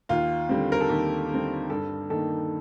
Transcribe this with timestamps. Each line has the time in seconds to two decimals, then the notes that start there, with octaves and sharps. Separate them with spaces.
0.09 D#2 F4
0.49 D3 G3 C4
0.72 A#4
0.81 A4
0.89 D#2 G4
1.30 D3 G3 C4
1.70 G2 A4
2.10 D#3 A#3 A4